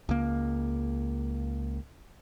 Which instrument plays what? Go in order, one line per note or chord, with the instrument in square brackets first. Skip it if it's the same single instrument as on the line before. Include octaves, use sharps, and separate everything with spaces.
[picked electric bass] C#2 A#3